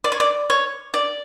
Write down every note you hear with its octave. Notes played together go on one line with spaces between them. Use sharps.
D5
C#5
D5
C#5
D5